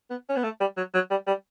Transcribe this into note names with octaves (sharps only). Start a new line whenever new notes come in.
B3
C#4
B3
A3
G3
F#3
F#3
G3
G3